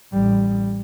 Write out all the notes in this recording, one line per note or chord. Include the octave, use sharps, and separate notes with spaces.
A1 G3